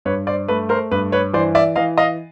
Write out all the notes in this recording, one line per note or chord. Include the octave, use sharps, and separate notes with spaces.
G2 B4 C#5
C5 D5
A3 B4
A#4 C5
G2 B4
B4 C#5
E3 C5 D5
D5 E5
E3 D#5 F5
D#5 F5